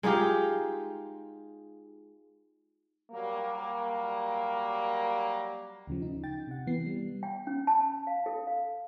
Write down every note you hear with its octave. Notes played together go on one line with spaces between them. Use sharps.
G#3 D#4 F4 G4
F#3 G3 A#3
D2 C#3 F3
C#3 D#4
G5 A6
C3 F#5
E3 B3 C7
G3
G5
C#4
A5
F5
A4
F5